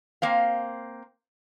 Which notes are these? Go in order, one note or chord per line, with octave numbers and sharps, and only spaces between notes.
A#3 C4 F5